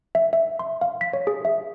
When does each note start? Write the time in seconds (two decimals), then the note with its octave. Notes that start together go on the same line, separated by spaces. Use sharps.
0.15 E5
0.33 E5
0.59 C6
0.81 F5
1.01 B6
1.13 C#5
1.27 G#4
1.45 E5